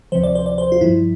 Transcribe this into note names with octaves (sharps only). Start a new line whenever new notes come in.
D2 C3 F3 C5
D5
C5
D5
C5
F4
G2 F3 E4